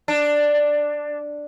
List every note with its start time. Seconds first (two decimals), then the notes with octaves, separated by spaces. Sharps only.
0.08 D4